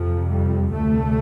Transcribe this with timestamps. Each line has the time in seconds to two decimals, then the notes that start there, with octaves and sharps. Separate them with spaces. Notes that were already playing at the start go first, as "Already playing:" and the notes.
Already playing: F2 C3 F3
0.29 G3
0.72 D2 C3 A3